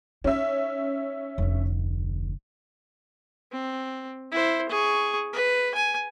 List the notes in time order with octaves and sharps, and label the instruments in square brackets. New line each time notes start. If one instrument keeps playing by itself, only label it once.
[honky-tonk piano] C#4 E5 [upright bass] D#4
[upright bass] F1 D2
[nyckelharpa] C4
E4 C5
G#4 C#6
B4
G#5